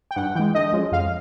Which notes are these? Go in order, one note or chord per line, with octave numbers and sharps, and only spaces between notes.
G5
G2 F#5
E3 G#3 G5
D3 D#5
F3 G#3 C#4
F2 F5